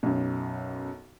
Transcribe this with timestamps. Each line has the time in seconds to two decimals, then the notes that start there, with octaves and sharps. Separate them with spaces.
0.03 B1 F#2